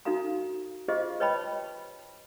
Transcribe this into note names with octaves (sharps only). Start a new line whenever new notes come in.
D#4 F#4 A4 F5 A#5
F4 G4 G#4 C5 D#5 F5
B4 C#5 D#5 G5 A5 B5